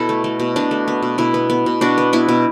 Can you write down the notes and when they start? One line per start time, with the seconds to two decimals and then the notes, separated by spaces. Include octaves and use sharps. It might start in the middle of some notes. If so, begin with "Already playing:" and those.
Already playing: B2 E4 A4
0.09 A3
0.24 A3
0.40 B2
0.56 B2 D4
0.71 A3
0.88 B3
1.03 B2
1.18 B2 E4
1.34 B3
1.50 B3
1.66 B2
1.81 B2 D4 F#4
1.98 B3
2.13 B3 E4
2.28 B2